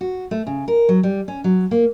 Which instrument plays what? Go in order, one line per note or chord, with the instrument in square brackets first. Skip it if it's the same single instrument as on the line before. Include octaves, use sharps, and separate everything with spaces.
[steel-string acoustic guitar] F#4
A3
C#3
A#4
F#3
G3
C#4
F#3
A#3